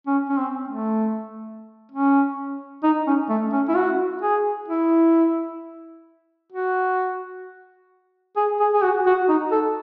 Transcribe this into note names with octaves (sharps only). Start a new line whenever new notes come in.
C#4
C#4
C4
A3
C#4
D#4
C#4
A3
C#4
E4
F#4
G#4
E4
F#4
G#4
G#4
G#4
F#4
F#4
D#4
A4